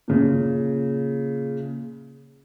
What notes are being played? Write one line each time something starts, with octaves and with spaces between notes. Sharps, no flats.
A#2 C#3